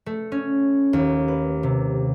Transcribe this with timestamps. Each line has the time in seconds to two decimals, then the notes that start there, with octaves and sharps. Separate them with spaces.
0.06 A3
0.32 C#4
0.93 D#2
1.28 B4
1.63 C3